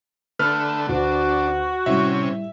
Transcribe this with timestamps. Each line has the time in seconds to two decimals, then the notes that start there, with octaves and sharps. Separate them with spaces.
0.39 D3 A3 B4 F6
0.89 D2 D4 F#4
1.86 A2 C3 G3 C#4 E5